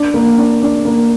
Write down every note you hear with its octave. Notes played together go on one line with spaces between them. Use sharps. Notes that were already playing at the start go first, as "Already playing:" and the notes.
Already playing: D4
A#3
D4
D4
A#3